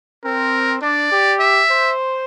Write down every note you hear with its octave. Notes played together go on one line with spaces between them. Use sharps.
C4 A#4
D4 D5
G4
E5
C5